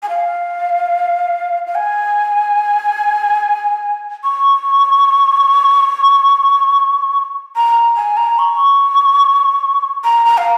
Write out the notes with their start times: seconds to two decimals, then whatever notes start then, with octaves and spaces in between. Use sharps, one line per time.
0.03 G#5
0.09 F5
1.67 F5
1.75 G#5
4.24 C#6
7.56 A#5
7.97 G#5
8.17 A#5
8.39 C#6
10.04 A#5
10.26 A#5
10.38 F5